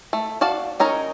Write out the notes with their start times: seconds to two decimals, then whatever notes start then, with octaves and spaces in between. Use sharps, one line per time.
0.13 A3
0.41 F#4 D5 F5 A5
0.80 C#4 D#4 A#4 C#5